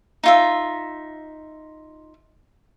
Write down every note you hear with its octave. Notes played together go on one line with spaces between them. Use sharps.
D#4 F4 E5